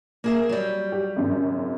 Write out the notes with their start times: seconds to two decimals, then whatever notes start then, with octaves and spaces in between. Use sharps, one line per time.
0.24 A#3 G#4 E5
0.49 F#3 G3
0.92 G4
1.16 G#1 F#2 C#3